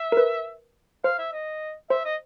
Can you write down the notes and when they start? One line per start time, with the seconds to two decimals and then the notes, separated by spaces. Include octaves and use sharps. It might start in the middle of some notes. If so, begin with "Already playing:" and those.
Already playing: E5
0.12 A#4
0.17 B4
1.04 C5 F5
1.18 E5
1.32 D#5
1.90 C5 E5
2.05 D#5